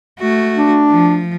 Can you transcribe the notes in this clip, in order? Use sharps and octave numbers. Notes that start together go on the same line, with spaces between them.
A3 F#4
D4
F3